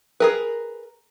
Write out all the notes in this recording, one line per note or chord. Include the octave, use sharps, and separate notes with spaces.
G#4 A#4 B4